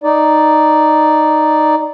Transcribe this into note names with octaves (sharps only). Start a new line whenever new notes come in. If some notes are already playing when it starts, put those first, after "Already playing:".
D#4 D5